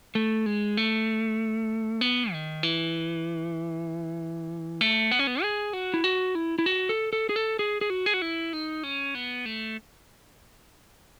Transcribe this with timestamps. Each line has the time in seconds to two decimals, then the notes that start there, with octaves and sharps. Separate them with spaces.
0.15 A3
0.46 G#3
0.77 A3
2.01 B3
2.32 D#3
2.63 E3
4.81 A3
5.11 B3
5.19 C#4
5.27 B3
5.42 G#4
5.73 F#4
5.94 E4
6.04 F#4
6.35 E4
6.59 E4
6.66 F#4
6.89 A4
7.13 A4
7.29 G#4
7.36 A4
7.59 G#4
7.81 G#4
7.90 F#4
8.06 G#4
8.14 F#4
8.22 E4
8.53 D#4
8.83 C#4
9.15 B3
9.46 A3